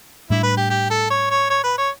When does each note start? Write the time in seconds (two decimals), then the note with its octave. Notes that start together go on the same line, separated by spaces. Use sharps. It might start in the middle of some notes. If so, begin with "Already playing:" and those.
0.30 A2 G3 D4 E4
0.43 B4
0.57 G4
0.70 G4
0.90 A4
1.10 C#5
1.30 C#5
1.50 C#5
1.63 B4
1.78 C#5